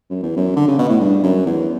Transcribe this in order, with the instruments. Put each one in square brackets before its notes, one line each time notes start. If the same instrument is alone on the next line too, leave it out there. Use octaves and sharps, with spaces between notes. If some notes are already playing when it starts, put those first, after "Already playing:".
[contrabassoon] F#2
E2
F#2
D3
C#3
B2
A2
G2
F#2
E2